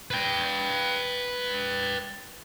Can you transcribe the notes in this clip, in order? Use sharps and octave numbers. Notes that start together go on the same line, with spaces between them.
B4 G5